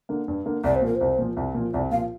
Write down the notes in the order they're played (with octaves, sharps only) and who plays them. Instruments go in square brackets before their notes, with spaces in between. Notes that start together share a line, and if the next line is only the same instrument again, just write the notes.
[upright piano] D3 A#3
G2
D3 A#3
[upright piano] C2 [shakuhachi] D5
[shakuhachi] C5
[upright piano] A#2 F3 [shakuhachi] A#4
[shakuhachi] C5
[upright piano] C2
A#2 F3
C2
A#2 F3
[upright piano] C2 [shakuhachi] D5
[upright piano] A#2 F3 [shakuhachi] F5